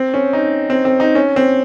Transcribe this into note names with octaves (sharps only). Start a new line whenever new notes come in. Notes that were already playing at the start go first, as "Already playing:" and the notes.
Already playing: C4
C#4
D#4
C4
C4
D#4
C#4
C4